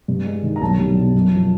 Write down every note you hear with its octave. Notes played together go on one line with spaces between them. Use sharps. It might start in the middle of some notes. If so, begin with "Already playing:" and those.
G2
G#3
D#3
A#5
B1 A5
G3
B2
F#2
F3